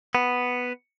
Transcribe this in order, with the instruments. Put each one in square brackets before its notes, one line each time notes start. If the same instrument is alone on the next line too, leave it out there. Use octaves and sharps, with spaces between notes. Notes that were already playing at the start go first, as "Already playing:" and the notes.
[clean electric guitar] B3